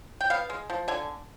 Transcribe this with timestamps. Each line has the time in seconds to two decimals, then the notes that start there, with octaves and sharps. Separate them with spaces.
0.21 G5
0.30 B3 F5
0.50 G#3
0.70 F3
0.88 D3 G#5